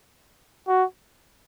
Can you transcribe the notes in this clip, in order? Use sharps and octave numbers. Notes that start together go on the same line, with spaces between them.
F#4